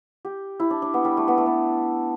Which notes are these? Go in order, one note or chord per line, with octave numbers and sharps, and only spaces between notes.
G4
E4
D4
D4
B3
G3
A3
B3
A3
B3